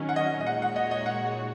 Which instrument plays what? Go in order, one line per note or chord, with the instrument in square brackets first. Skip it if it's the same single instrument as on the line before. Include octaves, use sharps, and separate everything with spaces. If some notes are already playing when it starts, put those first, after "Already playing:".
Already playing: [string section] D#3 F#3 C#4
[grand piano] F#5
D#5
D#5
[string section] A#2 G#3 D#4 F#4 C#5 [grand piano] F#5
[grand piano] F#5
D#5
D#5
F#5